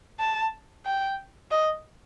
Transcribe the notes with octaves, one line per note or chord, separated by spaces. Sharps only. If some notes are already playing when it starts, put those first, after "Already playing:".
A5
G5
D#5